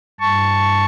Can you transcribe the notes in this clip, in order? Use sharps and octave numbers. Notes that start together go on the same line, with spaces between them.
G2 A5 C#6